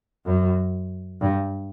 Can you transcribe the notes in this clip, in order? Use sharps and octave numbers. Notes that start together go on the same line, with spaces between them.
F#2
G2